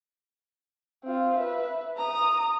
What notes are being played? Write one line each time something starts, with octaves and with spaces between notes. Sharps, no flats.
C4 F4
B4 E5
A#5 D#6